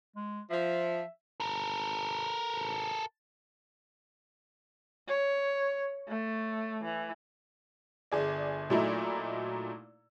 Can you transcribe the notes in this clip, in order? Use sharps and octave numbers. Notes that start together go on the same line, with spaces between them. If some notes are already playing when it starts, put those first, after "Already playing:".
G#3
F3 E5
A4 A#4
C#5
A3
E3
G1 G#4 D5
A#2 F#3 A3 D#4 E4